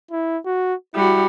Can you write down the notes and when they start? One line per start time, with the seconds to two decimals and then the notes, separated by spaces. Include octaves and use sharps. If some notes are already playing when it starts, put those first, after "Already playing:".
0.11 E4
0.46 F#4
0.94 G3 E4 F#4